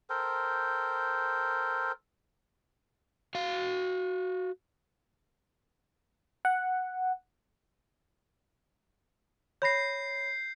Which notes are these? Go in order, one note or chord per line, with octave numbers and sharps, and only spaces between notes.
A4 A#4 C5 G5
F#4 F5
F#5
C#5 B5 G6 A#6 C7